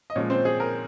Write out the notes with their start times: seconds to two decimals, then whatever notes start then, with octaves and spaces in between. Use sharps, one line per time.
0.10 D#5
0.16 A#2 F3 G#3 C#4 C#5
0.30 C4 C5
0.45 G#4
0.60 A#4